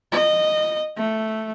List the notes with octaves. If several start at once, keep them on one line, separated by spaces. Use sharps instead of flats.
D#5
A3